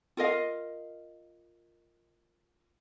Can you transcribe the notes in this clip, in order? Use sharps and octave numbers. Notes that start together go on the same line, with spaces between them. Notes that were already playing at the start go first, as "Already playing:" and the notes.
F4 A#4 D#5 F5